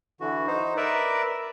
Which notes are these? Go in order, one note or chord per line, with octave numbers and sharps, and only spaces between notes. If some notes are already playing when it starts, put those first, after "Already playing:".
D3 E3 F#4
D#4 C5
A#4 B4 D5 E5